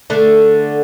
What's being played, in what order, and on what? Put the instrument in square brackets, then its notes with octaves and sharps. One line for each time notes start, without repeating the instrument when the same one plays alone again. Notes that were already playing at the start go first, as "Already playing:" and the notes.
[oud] D3 A3